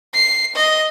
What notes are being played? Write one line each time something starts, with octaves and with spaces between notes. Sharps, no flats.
C7
D#5